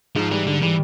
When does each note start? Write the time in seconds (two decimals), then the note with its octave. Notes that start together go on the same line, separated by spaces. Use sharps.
0.16 G#2 F3
0.31 E3 G3
0.47 G#2 D3
0.62 E3 G3